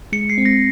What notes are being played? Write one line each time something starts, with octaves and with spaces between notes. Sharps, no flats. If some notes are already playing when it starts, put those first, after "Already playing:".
G#3 C#7
C7
C4
A#6